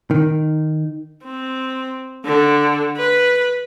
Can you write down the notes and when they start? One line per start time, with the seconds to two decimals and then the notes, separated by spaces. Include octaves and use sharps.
0.11 D#3
1.25 C4
2.25 D3
2.97 B4